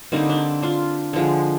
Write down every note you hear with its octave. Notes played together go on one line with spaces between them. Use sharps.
D3 G3 A#3 C4 D#4
D4
D4 F4
D3 F3 G#3